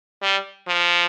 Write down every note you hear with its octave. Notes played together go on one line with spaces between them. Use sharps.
G3
F3